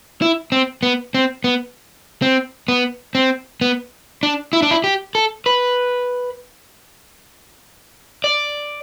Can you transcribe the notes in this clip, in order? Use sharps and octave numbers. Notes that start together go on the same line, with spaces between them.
E4
C4
B3
C4
B3
C4
B3
C4
B3
D4
E4
D4
E4
G4
A4
B4
D5